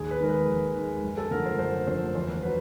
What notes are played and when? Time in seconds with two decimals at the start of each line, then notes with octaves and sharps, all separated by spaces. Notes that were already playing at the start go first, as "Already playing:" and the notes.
Already playing: D#2 G#4
0.11 B4
0.20 D#3 G#3 A#4
0.29 B4
0.48 D#2
0.75 D#3 G#3
1.04 F#2
1.17 A4
1.31 D3 F3 A3 A#4
1.46 C5
1.59 F#2 C5
1.87 D3 F3 A3 C5
2.15 E2 C5
2.43 F#3 B4